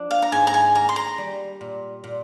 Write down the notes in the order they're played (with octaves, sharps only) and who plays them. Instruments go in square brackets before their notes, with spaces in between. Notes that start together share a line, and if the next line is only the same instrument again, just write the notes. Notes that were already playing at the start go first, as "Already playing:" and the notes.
Already playing: [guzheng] F3 D4
[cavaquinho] F5
A#5
[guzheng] G#2 [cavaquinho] G#5
[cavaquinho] A#5
G#5
[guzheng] A#3 [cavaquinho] A#5
[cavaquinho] C6
A#5
[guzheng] G3
A#2
A#2